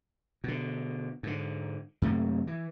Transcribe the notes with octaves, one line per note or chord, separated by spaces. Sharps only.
B2 D3
G#2 D3
F#2 C3 A3 A#3
E3